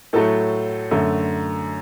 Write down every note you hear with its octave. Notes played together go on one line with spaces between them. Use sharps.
A2 F#3 A3 A4
F#2 D3 A3